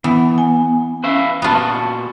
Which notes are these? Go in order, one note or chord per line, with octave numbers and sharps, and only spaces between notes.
E3 B3
G#5
C#4 B4 E5 F5
A#2 B3 F4 F#4 A5